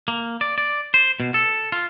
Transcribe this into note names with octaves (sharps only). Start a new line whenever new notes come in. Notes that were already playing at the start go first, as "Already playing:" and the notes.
A#3
D5
D5
C5
B2
A4
F4